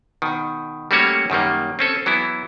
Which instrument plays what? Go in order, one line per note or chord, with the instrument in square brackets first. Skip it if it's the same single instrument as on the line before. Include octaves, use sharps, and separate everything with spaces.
[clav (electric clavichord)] B2 D#3
G3 A3 A#3 C#4 F#4 C#5
F#2 D#3 G3 A#3
C4 C#4 A4
E3 F#3 B3 E4